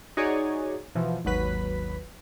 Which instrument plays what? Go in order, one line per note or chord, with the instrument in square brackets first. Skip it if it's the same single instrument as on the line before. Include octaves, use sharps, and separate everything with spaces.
[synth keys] D#4 F#4 G#4 C#5 D5
B2 E3 F3
G#1 D#2 F#3 B4 B6